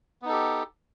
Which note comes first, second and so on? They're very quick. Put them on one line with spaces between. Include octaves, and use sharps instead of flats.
B3 D#4 A4 G4